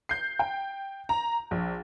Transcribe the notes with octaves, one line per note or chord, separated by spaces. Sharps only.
G6 C7
G5
A#5
A#1